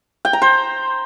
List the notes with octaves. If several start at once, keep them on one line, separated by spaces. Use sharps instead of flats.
G5
A#5
C5